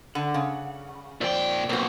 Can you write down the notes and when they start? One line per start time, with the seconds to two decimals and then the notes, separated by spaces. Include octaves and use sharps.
0.15 D3 F#5
0.34 C#3
1.21 F2 A#2 C5 D5 G5
1.69 B1 A#3 C4 F#4